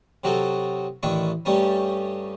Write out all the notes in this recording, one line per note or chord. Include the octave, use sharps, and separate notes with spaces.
C3 F#3 D#4 F#4 A4
A1 D#3 D4 E4 C#6
G2 G3 A3 C#4 D#4